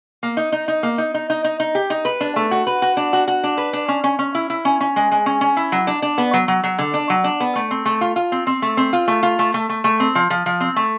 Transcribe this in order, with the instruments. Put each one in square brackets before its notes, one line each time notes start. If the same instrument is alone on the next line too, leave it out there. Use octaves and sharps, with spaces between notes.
[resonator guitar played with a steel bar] A#3
D#4
D#4
D#4
A#3
D#4
D#4
D#4
D#4
D#4
G4
D#4
B4
D4
A3
F#4
B4
F#4
D4
F#4
F#4
D4
B4
D4
C#4
C#4
C#4
E4
E4
C#4
C#4
G#3
G#3
C#4
C#4
E4
F#3
D4
D4
B3
F#3
F#3
F#3
D3
D4
F#3
D4
B3
A3
C4
A3
F4
F4
C4
C4
A3
C4
F4
A3
F4
A3
A3
A3
A3
C4
F3
F3
F3
C4
A3